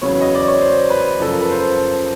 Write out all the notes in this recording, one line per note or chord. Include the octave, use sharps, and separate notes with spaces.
E2 C#3 F#3 B3 C#5
D#5
D5
C#5
C5
B4
F#2 C#3 F3 A4
A#4
B4
C5